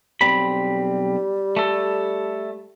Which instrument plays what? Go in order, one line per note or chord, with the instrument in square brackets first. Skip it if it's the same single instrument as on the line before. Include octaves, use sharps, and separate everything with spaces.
[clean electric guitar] B1 C4 B5 [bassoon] G3
[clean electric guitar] A3 A4